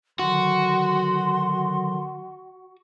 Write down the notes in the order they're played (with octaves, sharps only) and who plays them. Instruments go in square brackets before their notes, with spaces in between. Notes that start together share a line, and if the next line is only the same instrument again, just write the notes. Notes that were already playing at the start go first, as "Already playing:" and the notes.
[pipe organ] D3 D#3 F#3 [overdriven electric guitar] F#4 [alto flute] C6